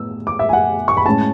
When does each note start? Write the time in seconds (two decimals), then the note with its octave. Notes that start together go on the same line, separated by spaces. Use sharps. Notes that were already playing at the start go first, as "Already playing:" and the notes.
Already playing: A2 B3 E6
0.27 D6
0.39 E5
0.49 G#5
0.53 F#5
0.88 C#6
0.97 B5
1.06 A2 G#3 C#4 A5